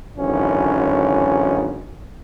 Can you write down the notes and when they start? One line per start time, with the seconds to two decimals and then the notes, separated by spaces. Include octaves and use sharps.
0.18 G#1 F#2 D3 E3 C#4 D#4